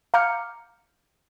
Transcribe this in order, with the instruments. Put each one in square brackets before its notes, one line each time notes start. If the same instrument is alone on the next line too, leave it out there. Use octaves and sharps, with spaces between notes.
[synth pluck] F5 A#5 D6 F6 G6 C#7